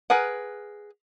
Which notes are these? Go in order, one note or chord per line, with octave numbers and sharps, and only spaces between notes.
G#4 A#4 B4 F#5